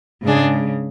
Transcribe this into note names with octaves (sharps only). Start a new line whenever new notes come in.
G#2 C#3 G#3 D4 G#4